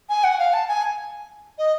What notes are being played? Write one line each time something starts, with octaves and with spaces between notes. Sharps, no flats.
G#5
F#5
F5
A5
G#5
D#5